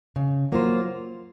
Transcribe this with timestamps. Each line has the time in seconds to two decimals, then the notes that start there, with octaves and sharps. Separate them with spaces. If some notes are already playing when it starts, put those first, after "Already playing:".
0.16 C#3
0.52 F#3 A#3 F4 C5